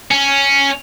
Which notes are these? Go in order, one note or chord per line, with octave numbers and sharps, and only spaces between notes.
C#4